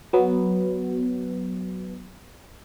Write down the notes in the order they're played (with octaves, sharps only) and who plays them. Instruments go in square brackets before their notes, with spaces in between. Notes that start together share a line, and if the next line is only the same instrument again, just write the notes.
[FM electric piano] F#3 B3